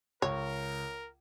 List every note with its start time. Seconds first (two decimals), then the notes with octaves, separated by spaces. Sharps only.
0.22 C#2 A#4 C#5